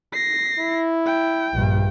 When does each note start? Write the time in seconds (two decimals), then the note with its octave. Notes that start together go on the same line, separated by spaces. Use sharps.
0.13 A#6 C7
0.59 E4
1.06 G5
1.54 A#1 G2